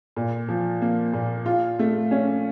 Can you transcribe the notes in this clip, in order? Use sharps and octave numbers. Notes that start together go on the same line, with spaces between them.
A#2
F3
A#3
A#2
F4
A3
C#4